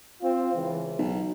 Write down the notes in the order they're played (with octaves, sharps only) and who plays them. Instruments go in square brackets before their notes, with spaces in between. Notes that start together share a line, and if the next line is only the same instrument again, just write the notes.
[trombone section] C4 F4
C#2 E3
[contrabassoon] B1